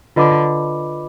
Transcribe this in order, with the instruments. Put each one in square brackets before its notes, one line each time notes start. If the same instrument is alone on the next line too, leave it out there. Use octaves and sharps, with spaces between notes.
[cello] D3 [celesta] F4 B4 D#5 B5 D6